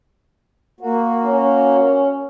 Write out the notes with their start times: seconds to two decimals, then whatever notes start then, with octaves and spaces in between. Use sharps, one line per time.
0.80 A#3 F#4
1.26 C#4